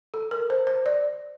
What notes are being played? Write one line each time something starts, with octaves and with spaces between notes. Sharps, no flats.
A4
A#4
C5
C5
D5